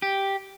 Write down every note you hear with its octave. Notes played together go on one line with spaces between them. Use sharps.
G4